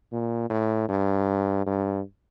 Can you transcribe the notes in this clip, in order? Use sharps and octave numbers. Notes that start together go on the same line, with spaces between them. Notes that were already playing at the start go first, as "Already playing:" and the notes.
A#2
A2
G2
G2